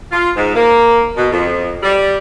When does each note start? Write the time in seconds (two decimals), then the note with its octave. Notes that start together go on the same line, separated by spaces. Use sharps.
0.11 F4
0.35 G#2
0.55 A#3
1.16 B2
1.31 F2
1.82 G3